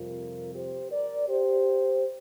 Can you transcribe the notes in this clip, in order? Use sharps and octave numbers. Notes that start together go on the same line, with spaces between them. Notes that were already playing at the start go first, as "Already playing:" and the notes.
Already playing: F2 C3 G3 C4 F4 A#4
G4 C5
A#4 D5
G4 C5